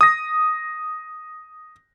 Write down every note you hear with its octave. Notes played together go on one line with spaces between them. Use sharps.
D#6 A#6